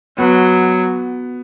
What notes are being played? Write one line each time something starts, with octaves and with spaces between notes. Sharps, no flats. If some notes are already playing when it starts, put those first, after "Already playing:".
F#3 B3